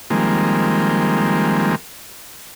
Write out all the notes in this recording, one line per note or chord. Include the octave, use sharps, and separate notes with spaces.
D#3 F3 G3 G#3 A#3 C4